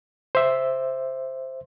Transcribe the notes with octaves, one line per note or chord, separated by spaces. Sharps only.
C5 E5